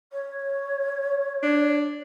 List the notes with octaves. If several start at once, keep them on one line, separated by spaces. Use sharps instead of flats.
C#5
D4